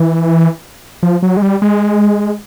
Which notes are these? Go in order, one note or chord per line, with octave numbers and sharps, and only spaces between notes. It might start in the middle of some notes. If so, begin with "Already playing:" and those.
Already playing: E3
F3
F#3
G#3
G3
G#3